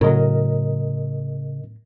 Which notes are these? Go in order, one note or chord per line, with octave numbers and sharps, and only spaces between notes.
A2 C#3 F#3 A#4 D#5